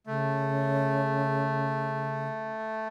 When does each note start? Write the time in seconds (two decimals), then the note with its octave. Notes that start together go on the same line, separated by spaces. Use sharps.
0.07 C#3 A3